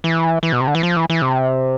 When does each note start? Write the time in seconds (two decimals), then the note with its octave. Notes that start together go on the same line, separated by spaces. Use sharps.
0.04 E3
0.43 E3
0.53 B2
0.61 C3
0.67 D3
0.75 E3
0.83 F3
0.96 E3
1.10 E3
1.22 C3